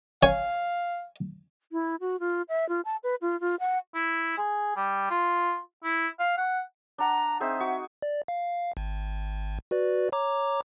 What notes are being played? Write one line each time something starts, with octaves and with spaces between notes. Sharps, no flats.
C#5 F5 G#5
E4
F#4
F4
E5
F4
A5
B4
F4
F4
F#5
E4
G#4
G3
F4
E4
F5
F#5
D4 F#5 A#5
C4 D#4 G#4 E5
F#4 C#6
D5
F5
G#1
F#4 B4 D5
C#5 A#5 D6